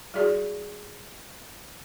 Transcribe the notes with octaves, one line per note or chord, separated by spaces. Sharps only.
G3 E4 F#4 G#4 D5